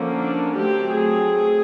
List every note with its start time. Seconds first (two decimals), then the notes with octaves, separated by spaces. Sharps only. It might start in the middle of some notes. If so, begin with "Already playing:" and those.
Already playing: D3 F3 A#3 C#4
0.14 D4
0.55 F#3 A3 C4 G4
0.96 G#4